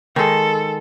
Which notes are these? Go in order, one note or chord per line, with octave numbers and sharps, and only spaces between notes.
D#3 G#3 A4